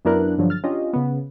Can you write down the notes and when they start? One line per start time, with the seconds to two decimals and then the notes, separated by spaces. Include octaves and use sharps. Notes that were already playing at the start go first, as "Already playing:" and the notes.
0.05 F#2 B3 D4 E4 A#4 F#6
0.38 G2 D3 F3 F#3
0.50 F6 A6
0.64 C#4 D4 F4 G4 D#5
0.93 C#3 B3